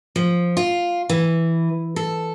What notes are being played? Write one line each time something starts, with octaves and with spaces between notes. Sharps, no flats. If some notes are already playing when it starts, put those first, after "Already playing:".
F3
F4
E3
A4